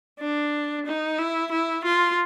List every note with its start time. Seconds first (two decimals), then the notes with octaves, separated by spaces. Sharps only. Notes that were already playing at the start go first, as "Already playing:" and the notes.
0.20 D4
0.86 D#4
1.19 E4
1.52 E4
1.85 F4